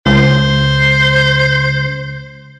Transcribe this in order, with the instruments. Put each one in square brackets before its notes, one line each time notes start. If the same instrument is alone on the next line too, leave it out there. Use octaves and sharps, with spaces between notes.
[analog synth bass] C#2 [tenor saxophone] C5